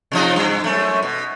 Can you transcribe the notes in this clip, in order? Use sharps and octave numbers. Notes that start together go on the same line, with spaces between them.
C3 F3 D#4
G2
F#2 A3
B2